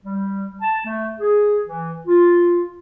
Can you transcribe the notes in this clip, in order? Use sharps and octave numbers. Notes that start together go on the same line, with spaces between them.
G3
A5
A3
G#4
E3
F4